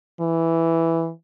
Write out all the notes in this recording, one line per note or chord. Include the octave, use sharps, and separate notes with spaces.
E3